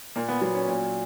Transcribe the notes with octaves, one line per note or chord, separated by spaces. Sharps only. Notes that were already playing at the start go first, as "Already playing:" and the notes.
A#2 A#3
B3
F#3 B3
C#4
A#2